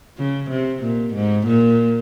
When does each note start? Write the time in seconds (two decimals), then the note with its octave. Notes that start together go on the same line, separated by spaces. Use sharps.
0.18 C#3
0.50 C3
0.83 A#2
1.15 G#2
1.47 A#2